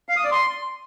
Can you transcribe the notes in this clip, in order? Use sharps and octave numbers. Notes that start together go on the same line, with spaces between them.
F5
D#6
D5
C6